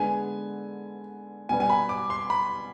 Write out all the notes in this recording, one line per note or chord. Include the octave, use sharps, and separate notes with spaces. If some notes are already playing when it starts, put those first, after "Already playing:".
Already playing: D3 G#3 B3 G#5
B2 G3 B3 G#5
G#5
B5
D6
C6
B5